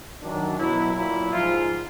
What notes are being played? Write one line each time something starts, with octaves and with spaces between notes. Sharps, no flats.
F#2 D#3 F#3 D4
B2 F#3 E4
A#2 F#3 E4
G#2 F3 F4